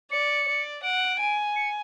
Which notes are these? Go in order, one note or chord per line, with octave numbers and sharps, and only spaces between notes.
D5 C#7
D5
F#5 D7
G#5
C#7